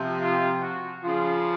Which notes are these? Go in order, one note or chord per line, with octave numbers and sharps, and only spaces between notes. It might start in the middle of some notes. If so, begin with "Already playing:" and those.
Already playing: C3 F3
F4
F#4
C#3 F3 F4